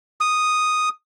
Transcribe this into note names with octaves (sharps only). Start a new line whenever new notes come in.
D#6